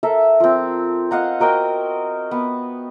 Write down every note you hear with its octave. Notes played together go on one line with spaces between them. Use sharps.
A4 A#4 E5
F3 C4
D#5 F5 F#5 A#5
F#4 A#4 D#5 G5
B3